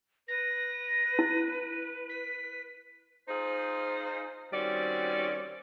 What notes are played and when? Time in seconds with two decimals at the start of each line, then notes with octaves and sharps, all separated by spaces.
0.28 B4 A#6
1.19 E4
2.09 B6
3.29 D#4 F4 G#4 C5
4.53 D#3 G3 C4 C#4 F#4 D5